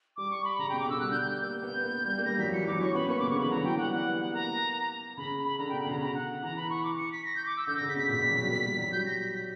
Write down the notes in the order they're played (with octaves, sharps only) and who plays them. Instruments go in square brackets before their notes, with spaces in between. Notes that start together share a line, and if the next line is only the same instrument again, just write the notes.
[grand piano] G3 [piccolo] D6
[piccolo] C#6
B5
[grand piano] C#3 [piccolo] A#5
[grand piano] B2 [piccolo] G5
[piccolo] D6
[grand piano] D3
[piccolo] E6
[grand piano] G3 [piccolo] F#6
[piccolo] G6
G6
G6
[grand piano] A#3 [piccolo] G6
[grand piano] B3
A#3
G3
A#3
[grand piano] G3 [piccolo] A#6
[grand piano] F#3 [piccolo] B6
[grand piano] E3 [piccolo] C#7
[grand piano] F#3 [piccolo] D6
[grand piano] C#4 [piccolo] C#6
[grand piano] B3 [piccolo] B5
[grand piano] A#3 [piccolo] C#6
[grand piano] C#3 [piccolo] D6
[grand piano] D3 [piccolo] C#6
[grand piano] E3 [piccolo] B5
[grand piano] F#3 [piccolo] A#5
[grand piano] E3
[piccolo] G5
[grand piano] E3
[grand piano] G3 [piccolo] F#5
[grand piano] B3 [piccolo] F#5
[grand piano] B3
B3
[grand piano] A#3 [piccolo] A#5
[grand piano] C#3 [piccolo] B5
[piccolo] B5
[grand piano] D3 [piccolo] A#5
[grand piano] B2 [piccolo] G5
[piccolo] B5
[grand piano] C#3 [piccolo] A#5
[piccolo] A#5
F#5
[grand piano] E3 [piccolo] A#5
[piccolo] B5
C#6
D6
C#7
B6
A#6
G6
D6
E6
[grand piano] D3 [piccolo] G6
[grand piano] C#3 [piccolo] A#6
[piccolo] B6
[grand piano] B2
[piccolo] B6
[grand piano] A#2
B2
F#3
G3
A#3
G3
F#3
[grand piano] G3 [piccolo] G6
[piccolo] A#6
B6
B6